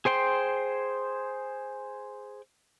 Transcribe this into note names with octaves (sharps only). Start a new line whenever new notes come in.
G#4 C5 G5 C6